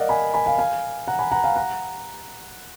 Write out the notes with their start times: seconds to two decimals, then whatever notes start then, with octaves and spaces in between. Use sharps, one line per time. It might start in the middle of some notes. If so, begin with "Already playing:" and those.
Already playing: A#4 D5 D#5 F5 F#5
0.09 G#5 B5
0.34 G#5 B5
0.46 F5 G#5
0.58 F5 G#5
1.08 F#5 A#5
1.19 G#5 B5
1.31 F#5 A#5
1.44 F5 G#5
1.56 F#5 A#5